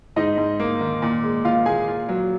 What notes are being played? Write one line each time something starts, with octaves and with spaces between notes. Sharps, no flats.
G#2 D#4 D#5
G#2
A#3
D#3
A#2
G#3
A#2 F4 F5
A#2 G#4 G#5
F4
F#3